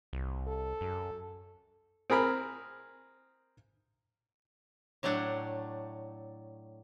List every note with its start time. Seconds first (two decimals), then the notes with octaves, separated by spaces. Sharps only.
0.13 C2
0.47 A4
0.81 F#2
2.10 C4 G#4 A#4 B5
5.03 A2 F#3 A3 D4 F#5